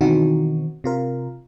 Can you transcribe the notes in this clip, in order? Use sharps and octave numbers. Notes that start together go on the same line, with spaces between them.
B2 D#3 E3 C4 D#4 F#4
C3 F4 A#4